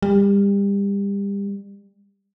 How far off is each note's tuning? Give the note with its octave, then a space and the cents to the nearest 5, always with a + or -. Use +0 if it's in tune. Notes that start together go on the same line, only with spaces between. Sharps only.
G3 +30